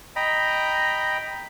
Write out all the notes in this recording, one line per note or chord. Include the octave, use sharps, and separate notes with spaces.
D#5 G5 A#5 B5